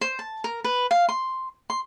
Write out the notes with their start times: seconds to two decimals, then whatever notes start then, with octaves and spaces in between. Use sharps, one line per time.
0.01 C5
0.19 A5
0.44 A#4
0.64 B4
0.91 F5
1.09 C6
1.70 C6